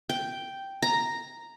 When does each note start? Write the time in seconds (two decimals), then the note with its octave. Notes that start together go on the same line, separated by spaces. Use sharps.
0.09 G5
0.82 A#5